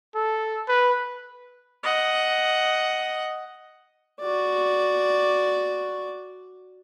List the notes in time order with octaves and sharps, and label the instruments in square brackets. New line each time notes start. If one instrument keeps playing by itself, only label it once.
[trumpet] A4
B4
[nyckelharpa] D#5 F#5
F#4 D5